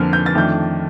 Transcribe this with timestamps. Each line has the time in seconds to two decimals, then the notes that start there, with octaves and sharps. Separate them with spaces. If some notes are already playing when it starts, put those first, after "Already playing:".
Already playing: F2 D3 F3 A#3 F6
0.13 G6
0.26 A6
0.35 F2 D#3 A3 D4 G6